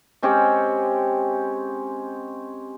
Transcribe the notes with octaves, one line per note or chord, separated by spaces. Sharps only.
G#3 C4 C#4 G4